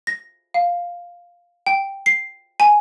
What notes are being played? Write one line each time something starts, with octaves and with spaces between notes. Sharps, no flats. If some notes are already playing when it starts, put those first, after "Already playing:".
A#6
F5
G5
C7
G#5